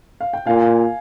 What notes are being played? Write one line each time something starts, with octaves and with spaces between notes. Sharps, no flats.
F5
G5
A#2 F5 G#5